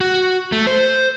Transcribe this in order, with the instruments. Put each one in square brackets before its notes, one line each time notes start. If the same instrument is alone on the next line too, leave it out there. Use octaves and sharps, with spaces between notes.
[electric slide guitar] F#4
A3
C5